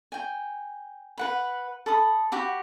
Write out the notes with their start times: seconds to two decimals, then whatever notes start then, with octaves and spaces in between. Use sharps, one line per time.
0.12 G5 G#5
1.18 B4 F#5 B5
1.86 A4 B5 D#6
2.32 F#4 G4 B5